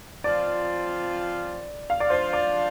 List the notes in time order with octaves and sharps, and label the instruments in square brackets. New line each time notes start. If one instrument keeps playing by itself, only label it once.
[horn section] F3 C4 F4 [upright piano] D5
[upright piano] F5
D5
[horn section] F3 D4 F4 [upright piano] C5
[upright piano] D5